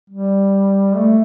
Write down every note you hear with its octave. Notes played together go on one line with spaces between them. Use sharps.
G3
A3